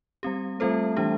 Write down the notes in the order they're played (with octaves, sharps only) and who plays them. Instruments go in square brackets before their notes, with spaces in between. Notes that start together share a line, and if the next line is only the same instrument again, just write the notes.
[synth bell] G3 C4 G4
[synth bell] G3 C4 F4 A4 C5 [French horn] A3
[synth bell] E3 G3 D4 G4